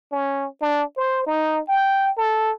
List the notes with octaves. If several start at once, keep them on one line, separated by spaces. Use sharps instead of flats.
C#4
D4
C5
D#4
G5
A4